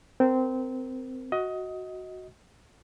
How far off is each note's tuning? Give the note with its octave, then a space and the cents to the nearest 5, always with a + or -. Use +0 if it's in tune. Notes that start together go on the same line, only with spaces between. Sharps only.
C4 -15 A#4 +0
F#4 +0 D#5 +20